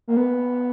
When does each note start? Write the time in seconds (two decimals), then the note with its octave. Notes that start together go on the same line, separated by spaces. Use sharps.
0.08 A#3
0.17 B3